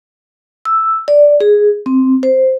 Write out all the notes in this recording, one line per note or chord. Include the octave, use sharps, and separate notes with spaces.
E6
D5
G#4
C4
C5